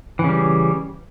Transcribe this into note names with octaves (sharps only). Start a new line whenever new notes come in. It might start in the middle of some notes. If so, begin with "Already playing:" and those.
C#3 E3 G3